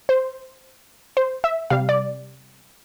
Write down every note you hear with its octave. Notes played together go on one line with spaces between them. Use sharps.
C5
C5
E5
C3 G3 F5
D5